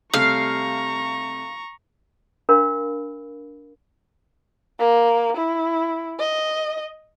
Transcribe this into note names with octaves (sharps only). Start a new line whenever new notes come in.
C3 G3 A3 F5 A#5 C#6
D4 A#4 F5 B5
A#3
E4
D#5